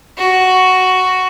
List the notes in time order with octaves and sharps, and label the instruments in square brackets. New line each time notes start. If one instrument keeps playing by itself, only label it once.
[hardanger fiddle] F#4